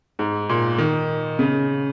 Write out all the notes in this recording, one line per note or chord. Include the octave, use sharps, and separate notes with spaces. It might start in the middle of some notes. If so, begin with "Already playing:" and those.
G#2
A#2
D#3
C#3